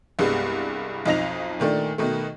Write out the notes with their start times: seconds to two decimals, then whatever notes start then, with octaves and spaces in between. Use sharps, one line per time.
0.19 C2 G2 G3 G#3 B3
1.06 B1 F2 D#4 A#6 F7
1.60 A#2 D#3 A3 D4
1.98 B2 D#3 A3